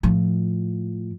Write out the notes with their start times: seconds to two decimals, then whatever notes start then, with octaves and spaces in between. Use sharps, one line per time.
0.03 A2 F3